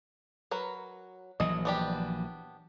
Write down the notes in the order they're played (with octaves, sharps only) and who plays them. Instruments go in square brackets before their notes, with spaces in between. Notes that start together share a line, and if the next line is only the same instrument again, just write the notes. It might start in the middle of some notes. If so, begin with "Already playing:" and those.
[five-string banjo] F#3 A#4 B4
[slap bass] A#1 E3 F#3 [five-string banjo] D#5
[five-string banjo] B3 D4 G4